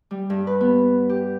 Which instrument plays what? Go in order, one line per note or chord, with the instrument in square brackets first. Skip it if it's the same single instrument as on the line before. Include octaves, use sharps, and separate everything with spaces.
[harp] G3
G2
B4
B3
G4